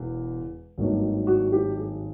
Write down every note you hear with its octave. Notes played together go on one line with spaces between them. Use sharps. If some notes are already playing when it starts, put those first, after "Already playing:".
Already playing: E1 E2
G#1 G2 D#3 F#3 A#3
F#4
G4
G#4